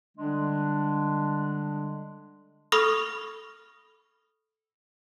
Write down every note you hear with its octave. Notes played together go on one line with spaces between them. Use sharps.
D3 G3 G#3 D4
A4 B5 C#6 D#6 F6 A#6